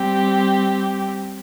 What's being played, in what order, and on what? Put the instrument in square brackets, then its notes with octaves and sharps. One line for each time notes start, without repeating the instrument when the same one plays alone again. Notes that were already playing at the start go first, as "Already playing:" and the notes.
Already playing: [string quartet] G3 C4 G4